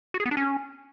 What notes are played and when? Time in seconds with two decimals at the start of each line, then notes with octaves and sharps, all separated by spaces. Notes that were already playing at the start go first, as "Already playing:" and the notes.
0.14 F#4
0.20 G#4
0.26 B3
0.31 D4
0.37 C#4